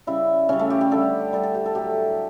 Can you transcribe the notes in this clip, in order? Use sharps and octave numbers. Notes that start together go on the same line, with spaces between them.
C#3 G3 E4
C#3 G3 C#4
A3
G4
G4
D3 G3 A4
D3 G3 A4
A4
G4
A4
A2 F#3 A3 G4